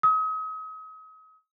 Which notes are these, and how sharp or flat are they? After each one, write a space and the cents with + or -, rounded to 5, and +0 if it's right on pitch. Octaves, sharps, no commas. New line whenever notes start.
D#6 +40